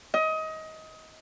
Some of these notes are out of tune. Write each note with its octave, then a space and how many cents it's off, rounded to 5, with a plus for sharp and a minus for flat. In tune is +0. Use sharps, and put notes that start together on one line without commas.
D#5 +25